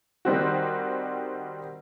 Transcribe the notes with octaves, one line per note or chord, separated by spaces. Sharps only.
D#3 G3 C4 F#4